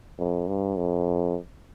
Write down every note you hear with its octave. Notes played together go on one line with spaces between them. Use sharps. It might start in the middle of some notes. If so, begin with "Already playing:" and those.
F2
G2
F2